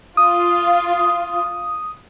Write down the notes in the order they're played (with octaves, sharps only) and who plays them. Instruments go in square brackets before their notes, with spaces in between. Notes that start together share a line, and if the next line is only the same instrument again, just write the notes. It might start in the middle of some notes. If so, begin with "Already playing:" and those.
[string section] F4 [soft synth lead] D#6